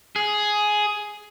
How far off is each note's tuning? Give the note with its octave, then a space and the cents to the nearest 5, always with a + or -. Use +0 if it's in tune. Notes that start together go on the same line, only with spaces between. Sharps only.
G#4 +10